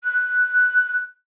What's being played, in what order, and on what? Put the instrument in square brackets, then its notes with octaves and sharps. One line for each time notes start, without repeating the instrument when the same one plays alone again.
[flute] F#6